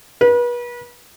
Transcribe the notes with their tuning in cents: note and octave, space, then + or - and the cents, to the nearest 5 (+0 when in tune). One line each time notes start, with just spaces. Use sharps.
B4 -35